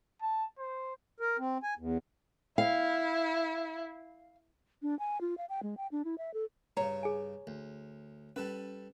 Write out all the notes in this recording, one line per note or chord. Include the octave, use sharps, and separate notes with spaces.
A5
C5
A#4
C4
G#5
E2
E4 F5
D4
G#5
F4
F5
G5
G#3
G5
D4
E4
E5
A4
G2 C#3 C#5 A#5
G#4 G#5
D2
G3 C#4 A4 B4